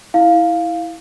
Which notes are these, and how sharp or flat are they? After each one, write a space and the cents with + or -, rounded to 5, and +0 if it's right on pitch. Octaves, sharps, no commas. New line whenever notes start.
E4 -15 F5 +0